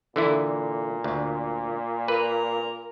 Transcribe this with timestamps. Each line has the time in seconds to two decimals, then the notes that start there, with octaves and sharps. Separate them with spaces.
0.16 A#2 D3 E3 E4
1.04 D2
2.08 A#4 B4